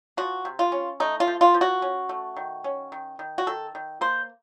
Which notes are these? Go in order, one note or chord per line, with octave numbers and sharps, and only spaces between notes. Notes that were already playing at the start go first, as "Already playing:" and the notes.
F3 F#4
C3
F4
C#4
A3 D#4
F4
F3
F4
F3
F#4
C#4
A3
D#3
C#4
D#3
D#3
F#4
D#3 A4
D#3
A#3 C5